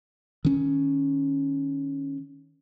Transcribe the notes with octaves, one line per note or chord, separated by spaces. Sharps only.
D#3 C#4